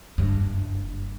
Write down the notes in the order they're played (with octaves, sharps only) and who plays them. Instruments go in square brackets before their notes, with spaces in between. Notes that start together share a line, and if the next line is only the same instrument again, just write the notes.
[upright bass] F#1 G2